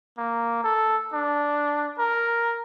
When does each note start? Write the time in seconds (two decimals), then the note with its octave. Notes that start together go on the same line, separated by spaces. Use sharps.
0.18 A#3
0.64 A4
1.14 D4
1.99 A#4